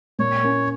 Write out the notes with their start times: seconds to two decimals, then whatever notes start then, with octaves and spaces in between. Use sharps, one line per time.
0.19 A#2 C#5
0.43 A#3 C#4